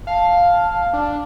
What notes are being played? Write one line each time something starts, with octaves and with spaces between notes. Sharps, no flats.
F5 A5
D4